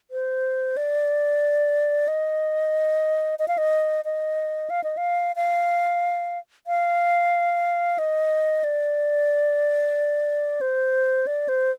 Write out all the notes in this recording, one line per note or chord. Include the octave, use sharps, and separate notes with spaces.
C5
D5
D#5
D#5
F5
D#5
D#5
F5
D#5
F5
F5
F5
D#5
D5
C5
D5
C5